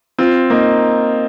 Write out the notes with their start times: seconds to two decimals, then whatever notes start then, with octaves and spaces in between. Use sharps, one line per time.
0.18 C4 F4
0.50 A#3 D#4